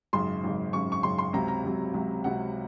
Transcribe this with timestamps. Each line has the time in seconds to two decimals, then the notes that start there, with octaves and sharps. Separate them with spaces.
0.13 G#1 F#2 C#3 C6
0.44 G#1 F#2 C#3
0.73 G#1 F#2 C#3 C#6
0.92 C#6
1.03 G#1 F#2 C#3 C6
1.18 C6
1.33 C#2 C3 F#3 A#5
1.48 A#5
1.64 C#2 C3 F#3
1.94 C#2 C3 F#3
2.24 C#2 C3 F#3 F#5